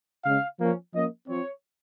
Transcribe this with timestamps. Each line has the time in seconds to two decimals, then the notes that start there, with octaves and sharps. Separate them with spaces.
0.24 C#3 G#3 C#4 F5
0.60 F3 A#3 C#4
0.94 F3 A#3 C#4 D#5
1.28 F3 C4 C#5